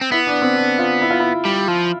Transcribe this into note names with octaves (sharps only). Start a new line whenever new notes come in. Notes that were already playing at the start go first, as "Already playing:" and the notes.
C4
B3 E4
D4
C4
D4
F4
E4
F4
E4
G3
F3